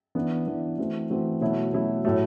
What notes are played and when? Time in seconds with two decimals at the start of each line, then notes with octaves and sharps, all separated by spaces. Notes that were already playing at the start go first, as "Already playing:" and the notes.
0.15 E3 B3 D4
0.47 E3 B3 D4
0.78 E3 A3 C4 F#4
1.10 E3 A3 C4 F#4
1.41 B2 F#3 A3 E4
1.73 B2 F#3 A3 E4
2.05 A2 F#3 A3